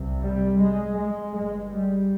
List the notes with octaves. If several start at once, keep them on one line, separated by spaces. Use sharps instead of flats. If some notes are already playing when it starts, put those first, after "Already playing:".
Already playing: C2 C3
G3
G#3
G#3
G1 G2 G#3
G3